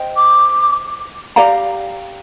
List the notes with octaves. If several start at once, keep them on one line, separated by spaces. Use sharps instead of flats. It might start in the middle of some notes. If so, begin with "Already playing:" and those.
Already playing: C5 D#5 G5
D6
G4 D5 F5 A#5